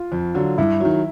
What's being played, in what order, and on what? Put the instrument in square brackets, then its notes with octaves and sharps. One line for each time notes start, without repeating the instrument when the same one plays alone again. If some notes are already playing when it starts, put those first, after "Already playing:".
Already playing: [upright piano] F4
[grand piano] F2
D3 F#3
[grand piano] G2 [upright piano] E4
[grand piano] D#3 F#3